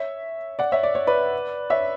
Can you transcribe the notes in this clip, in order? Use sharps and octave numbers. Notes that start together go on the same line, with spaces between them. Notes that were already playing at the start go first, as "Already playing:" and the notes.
Already playing: C#5 E5
D5 F#5
C#5 E5
D5
C#5
B4 D5
C#5 E5